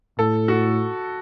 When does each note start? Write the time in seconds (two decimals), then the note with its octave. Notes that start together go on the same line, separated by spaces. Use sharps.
0.19 A2 A4
0.48 F#4